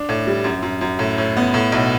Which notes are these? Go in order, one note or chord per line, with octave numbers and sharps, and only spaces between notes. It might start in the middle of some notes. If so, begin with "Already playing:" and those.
Already playing: D4
A2
G3
F#2
F#2
F#2
A2
A2
B3
A2
B1